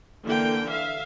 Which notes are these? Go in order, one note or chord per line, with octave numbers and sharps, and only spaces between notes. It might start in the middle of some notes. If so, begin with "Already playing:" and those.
D3 E3 A#3 G5
E5 F5